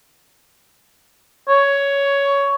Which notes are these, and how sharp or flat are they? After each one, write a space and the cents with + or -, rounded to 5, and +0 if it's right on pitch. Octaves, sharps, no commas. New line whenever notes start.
C#5 +10